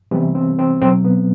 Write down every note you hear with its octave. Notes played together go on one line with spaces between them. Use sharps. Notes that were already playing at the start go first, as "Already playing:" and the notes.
C3 E3 G3 B3
C4
C4
B2 F#3 C4
B3